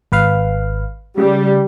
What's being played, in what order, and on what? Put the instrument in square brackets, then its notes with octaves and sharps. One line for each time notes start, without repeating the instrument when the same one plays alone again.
[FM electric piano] G#1 B4 F5
[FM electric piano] C#3 [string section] G3